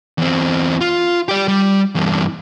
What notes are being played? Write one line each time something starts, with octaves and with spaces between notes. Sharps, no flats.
E2 C4
F4
G4 D5
G3
E2 G2